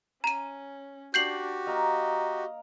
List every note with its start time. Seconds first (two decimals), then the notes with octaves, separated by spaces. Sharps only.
0.24 C#4 A#5 D#7
1.14 D4 F#4 G4 G6 C7 F#7
1.66 A#3 A#4 D#5 A#5